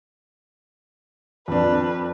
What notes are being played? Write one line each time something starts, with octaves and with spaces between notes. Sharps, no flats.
F2 D4 B4